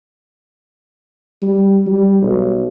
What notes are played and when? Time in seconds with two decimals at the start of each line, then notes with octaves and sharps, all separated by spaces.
1.42 G3
1.87 G3
2.22 B1